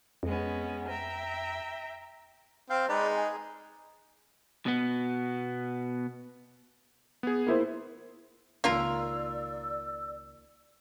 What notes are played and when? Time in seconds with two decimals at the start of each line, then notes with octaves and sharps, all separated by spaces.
0.23 F2 G#3 B3 C#4
0.89 E5 G5 A#5
2.70 C4 F5 G5
2.89 G#3 D#4 B4 D5
3.17 G#4
4.66 B2 B3
7.23 B3 G#4
7.47 A#3 E4 C5
8.64 C#2 D#3 A#3 F4 A#4 D5 E6